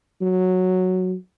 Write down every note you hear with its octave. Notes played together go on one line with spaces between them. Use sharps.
F#3